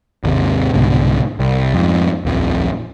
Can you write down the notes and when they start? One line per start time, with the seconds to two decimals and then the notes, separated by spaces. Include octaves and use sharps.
0.24 G#1 D#2 C3
0.74 C2 G#2 B2 D3
1.39 C2
1.74 F2 G#2
2.25 D#1 A#1 F2